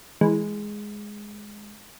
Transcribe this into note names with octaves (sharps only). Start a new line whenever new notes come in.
E3 G#3